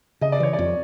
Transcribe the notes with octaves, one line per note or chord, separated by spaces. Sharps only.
C#3 D#5
D5
E3 C#5
D5
F2